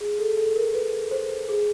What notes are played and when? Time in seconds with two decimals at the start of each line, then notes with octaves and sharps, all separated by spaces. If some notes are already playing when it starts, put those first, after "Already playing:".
0.01 G#4
0.19 A4
0.37 A4
0.56 A#4
0.74 B4
1.11 C5
1.49 G#4